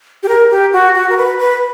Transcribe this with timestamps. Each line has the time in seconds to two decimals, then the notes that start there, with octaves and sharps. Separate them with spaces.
0.23 G4
0.28 A#4
0.50 G4
0.73 F#4
0.94 F#4
1.09 A#4
1.17 B4
1.39 B4